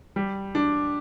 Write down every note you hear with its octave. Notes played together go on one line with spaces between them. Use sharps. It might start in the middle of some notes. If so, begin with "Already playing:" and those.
G3
D4